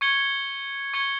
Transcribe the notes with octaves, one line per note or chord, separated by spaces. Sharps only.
C#6 G#6 C#7 G7
C#6 G#6 C#7 G7